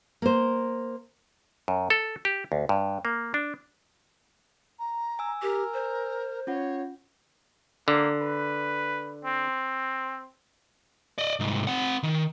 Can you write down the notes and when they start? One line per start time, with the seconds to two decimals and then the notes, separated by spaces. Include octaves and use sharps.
0.22 A#3 C5
1.68 F#2
1.90 A4
2.25 G4
2.52 D2
2.69 G2
3.05 A#3
3.34 D4
4.79 A#5
5.19 G#5 E6
5.42 G4 A#4
5.74 C5
6.47 C#4 F4 C#5 F#5
7.88 D3 A#3
8.21 B4
9.25 C4
11.18 D5 D#5
11.40 C2 G#2
11.67 C4 F#5
12.03 D#3